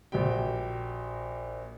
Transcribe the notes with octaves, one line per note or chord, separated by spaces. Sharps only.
A#1 F#4 G4 G5